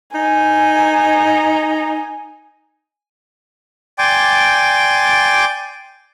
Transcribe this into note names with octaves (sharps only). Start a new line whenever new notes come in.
D#4 G#5
D5 G5 G#5 C6 D6